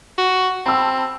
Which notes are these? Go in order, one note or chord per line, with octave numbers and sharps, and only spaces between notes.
F#4
C4 A5 B5 E6